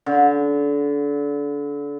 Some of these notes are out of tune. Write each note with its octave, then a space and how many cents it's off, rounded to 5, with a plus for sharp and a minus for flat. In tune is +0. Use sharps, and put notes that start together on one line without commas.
D3 -30